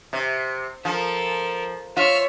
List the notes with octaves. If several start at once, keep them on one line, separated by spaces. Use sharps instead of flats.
C3
F3 A4 A#4
F4 C#5 E5 F6